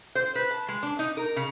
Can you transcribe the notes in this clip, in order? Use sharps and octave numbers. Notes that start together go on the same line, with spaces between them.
C5
B4
A5
G#3
D4
D#4
A#4
C#3